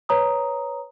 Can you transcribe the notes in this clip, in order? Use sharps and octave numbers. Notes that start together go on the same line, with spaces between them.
B4 C#5 A#5 D#6